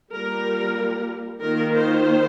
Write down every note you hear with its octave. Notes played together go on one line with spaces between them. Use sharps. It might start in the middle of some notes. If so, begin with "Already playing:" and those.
G3 A#3 F4 A#4
D#3 A#3 F4 A#4
C5